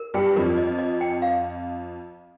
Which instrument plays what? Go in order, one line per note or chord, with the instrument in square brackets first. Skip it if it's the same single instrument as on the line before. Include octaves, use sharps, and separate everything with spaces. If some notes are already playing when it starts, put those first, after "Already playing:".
Already playing: [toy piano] A#4
[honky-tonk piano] G2 G3 [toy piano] G5
[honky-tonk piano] F2 F3 [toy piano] A#4
[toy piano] D#5
D#5
G5
F5